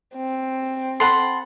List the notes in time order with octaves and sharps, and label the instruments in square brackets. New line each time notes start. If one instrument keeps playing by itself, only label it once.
[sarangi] C4
[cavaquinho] A4 F#5 B5 [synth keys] C6